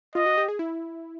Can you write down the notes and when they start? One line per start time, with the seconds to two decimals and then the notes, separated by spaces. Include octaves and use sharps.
0.15 F4 D#5
0.26 F#4
0.37 G4
0.48 G#4
0.59 E4